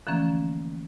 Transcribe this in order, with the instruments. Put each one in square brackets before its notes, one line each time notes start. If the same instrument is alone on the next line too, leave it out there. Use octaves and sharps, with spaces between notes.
[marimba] D3 E3 F3 A3 A#3 C#4